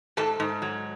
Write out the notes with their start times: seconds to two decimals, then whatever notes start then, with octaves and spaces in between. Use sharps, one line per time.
0.17 G#2 A4 A5
0.40 G#2
0.62 F#3